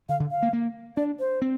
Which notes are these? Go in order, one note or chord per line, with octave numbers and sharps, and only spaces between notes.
D3 F5
D3
F5
A#3
A#3
D4 D5
C5
C4